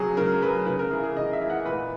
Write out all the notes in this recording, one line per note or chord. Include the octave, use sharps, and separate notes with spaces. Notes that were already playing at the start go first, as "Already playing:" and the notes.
Already playing: C#3 F#3 G#4
C#3 A#4
F#3 B4
C#3 B4
A#4
E3 G#4
G#4
C#3 D#5
E5
E3
F#5
A#2 B4